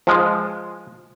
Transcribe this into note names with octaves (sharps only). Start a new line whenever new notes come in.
F3 G#3